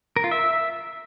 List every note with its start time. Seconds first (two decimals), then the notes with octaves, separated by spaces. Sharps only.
0.16 A#4
0.24 F4
0.31 E5